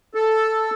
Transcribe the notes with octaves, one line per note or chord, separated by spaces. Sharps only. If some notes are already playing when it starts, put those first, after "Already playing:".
A4